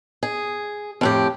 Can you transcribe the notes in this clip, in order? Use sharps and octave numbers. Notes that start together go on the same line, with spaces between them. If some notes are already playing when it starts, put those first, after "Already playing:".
G#4
F2 A2 G4